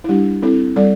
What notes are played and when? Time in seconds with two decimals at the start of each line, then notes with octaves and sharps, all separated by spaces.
0.04 E4
0.09 G3 D4 G4
0.42 C4 E4 A4
0.76 G3 A4 D5